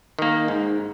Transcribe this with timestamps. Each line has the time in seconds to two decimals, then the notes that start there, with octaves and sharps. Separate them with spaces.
0.19 D#3 A#3
0.48 G#2